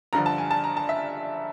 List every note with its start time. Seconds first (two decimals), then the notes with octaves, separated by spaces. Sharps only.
0.13 G2 D3 F3 A#5
0.26 A5
0.38 G#5
0.51 A5
0.64 A#5
0.77 A5
0.89 E5